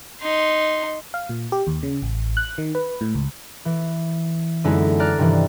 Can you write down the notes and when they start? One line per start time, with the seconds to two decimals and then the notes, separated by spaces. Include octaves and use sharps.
0.22 D#4 C6
1.14 F5
1.29 A#2
1.52 G4
1.67 D#2
1.83 C#3
2.02 A1
2.37 F#6
2.58 D#3
2.75 B4
3.01 A2
3.15 C#2
3.65 E3
4.64 F#2 D3 G#3 B3 D#4 E4
5.00 D5 A#5 F6 F#6 A6
5.18 G2 C3 D#3 E3